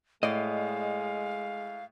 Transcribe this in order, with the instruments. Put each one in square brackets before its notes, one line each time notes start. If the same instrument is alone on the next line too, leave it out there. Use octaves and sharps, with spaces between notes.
[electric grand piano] A2 [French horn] G#3 [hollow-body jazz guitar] D5 D#5 [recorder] F5